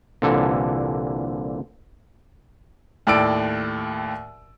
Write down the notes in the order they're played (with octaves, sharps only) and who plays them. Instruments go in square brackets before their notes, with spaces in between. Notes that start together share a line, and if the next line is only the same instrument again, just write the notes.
[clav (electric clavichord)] C2 A#2 D3 E3 A4
[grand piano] D#2 A2 D5 E6 D7